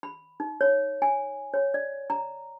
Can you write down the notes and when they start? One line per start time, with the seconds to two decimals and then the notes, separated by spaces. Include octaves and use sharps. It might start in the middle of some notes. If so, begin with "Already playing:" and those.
0.03 B5
0.40 D#4
0.61 C#5
1.02 G#5
1.54 C#5
1.74 D5
2.10 A#5